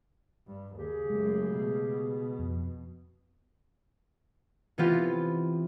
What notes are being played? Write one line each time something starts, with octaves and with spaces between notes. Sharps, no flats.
G2
D#2 C#3 G4 G#4
F#2 G#3 A3
B2
F2
E3 B3 C4 F4 G4